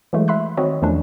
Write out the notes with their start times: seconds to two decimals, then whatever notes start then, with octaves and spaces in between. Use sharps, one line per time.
0.13 E3 F#3 G#3 A3
0.28 E5 B5 C6 F#6
0.57 D#3 C4 F#4 C#5 D#5
0.82 E2 D#3 F3 A3 C#4 D4